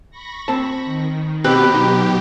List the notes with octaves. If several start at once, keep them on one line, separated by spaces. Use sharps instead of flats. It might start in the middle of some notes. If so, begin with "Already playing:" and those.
B5 C#6 A#6
C4 A5
D#3
B2 C4 G4 B4
F#3 D#4